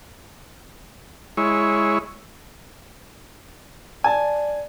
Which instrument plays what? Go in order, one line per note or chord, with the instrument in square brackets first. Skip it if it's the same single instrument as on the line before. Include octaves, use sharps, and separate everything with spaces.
[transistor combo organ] G#3 E4 C#5
[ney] D5 [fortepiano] G#5 A5